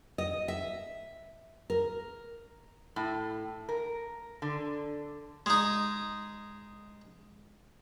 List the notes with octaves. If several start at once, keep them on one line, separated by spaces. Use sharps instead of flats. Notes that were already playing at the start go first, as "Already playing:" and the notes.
D#5
E5
A#4
A2
A#4
D3
G#3 D#4